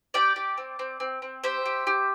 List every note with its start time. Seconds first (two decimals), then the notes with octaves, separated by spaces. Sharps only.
0.14 G4 D5 G5
0.36 G4
0.58 C4
0.79 C4
1.00 C4
1.22 C4
1.44 G4 C5 E5
1.66 G4
1.87 G4